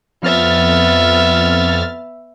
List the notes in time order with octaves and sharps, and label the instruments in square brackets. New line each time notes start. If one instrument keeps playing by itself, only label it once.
[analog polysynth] F2 F6 A6 [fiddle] B3 E5